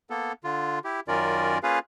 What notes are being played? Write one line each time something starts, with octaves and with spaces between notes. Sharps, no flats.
A#3 B3 A4
D3 F4
E4 G4
F#2 D#3 C#4 F4 A#4 D5
A#3 C#4 F4 G#4 B4 F5